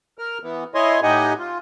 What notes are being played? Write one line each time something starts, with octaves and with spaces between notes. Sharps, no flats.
A#4 F6
E3 B3
E4 C#5 D#5 G#5 C6
A2 D#4 G4 D#5 F#5 G#5
F4